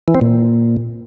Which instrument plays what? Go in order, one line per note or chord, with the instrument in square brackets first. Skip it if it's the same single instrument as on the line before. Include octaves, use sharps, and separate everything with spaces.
[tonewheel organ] E3
C4
A#2